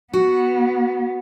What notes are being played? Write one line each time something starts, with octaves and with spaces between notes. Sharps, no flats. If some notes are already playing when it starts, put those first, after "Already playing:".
B3 F#4